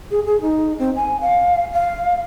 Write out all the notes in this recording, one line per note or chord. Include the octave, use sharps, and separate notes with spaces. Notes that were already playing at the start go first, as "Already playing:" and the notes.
G#4
G#4
D#4
C4
G#5
F5
F5